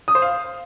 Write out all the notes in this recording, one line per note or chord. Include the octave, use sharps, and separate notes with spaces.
D#6
C5
F5